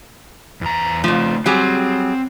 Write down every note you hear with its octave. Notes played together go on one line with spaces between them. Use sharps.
E2 A#5
F2 C#3 F3 A3
F#3 G3 C4 G#4